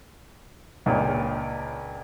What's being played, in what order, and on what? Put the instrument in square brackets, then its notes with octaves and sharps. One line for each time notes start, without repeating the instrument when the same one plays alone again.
[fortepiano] C#2 A#2 D4 C#5 G5